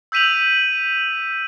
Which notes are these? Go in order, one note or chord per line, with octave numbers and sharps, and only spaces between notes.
E6 G6 B6 D#7 F7 F#7